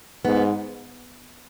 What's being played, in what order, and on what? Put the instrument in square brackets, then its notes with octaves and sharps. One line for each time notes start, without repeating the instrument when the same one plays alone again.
[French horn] G#2 [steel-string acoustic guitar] B3